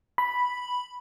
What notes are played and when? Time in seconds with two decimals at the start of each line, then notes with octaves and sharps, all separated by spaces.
0.18 B5